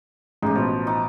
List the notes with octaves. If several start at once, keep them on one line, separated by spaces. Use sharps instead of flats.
A1 G#3 D#4 G4
B2 F3 B4
D#4 F#5 D6